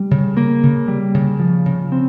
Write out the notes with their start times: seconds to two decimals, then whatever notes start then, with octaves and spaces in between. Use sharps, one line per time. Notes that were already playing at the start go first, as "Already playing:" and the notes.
Already playing: G3
0.11 C#3
0.37 A#3
0.63 C#3
0.88 G3
1.14 C#3
1.40 F3
1.66 C#3
1.92 C4